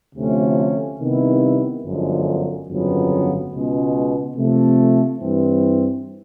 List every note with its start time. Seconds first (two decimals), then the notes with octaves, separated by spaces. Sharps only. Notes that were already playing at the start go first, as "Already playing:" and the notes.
0.15 D2 C3 F3 A3 C#4
0.99 C3 D#3 G3 B3 E4
1.83 G1 F#2 D3 F3 G#3
2.67 G1 F2 C#3 F#3 B3
3.51 C#2 B2 G#3
4.35 C3 F3 A3
5.19 G2 E3 G3 C4